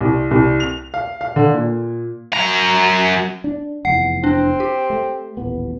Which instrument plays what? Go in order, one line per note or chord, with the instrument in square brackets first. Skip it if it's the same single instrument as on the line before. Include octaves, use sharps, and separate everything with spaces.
[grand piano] C2
C2
F7
F5
F5
D3
A#2
[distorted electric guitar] F#2 A#5
[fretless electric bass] D4
[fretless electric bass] F1 E2 [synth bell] F#5 C7
[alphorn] C4 [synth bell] D4
[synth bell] G4
[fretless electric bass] A3
D#1 A1 B3